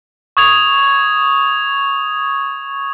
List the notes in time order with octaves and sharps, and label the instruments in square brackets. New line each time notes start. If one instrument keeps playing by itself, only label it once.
[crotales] C#6 D#6 G#6 F7